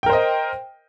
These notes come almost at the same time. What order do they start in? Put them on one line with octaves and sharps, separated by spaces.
G5 A#4 C5 D#5